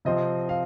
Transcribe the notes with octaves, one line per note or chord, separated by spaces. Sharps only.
C3 F3 C4 D#5
F5